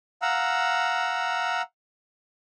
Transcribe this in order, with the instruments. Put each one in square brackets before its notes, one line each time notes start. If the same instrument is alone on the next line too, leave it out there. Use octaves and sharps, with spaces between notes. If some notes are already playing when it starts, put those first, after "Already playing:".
[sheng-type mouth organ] F5 F#5 A#5 E6